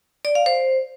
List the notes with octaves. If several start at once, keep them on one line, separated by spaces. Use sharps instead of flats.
D5
F5
C5